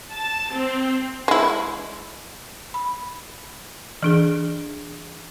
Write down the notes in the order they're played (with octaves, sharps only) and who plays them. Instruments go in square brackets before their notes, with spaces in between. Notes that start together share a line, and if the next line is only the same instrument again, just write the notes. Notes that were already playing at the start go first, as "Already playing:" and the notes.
[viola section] A5
C4
[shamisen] G#3 E4
[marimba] B5
E3 D4 G#4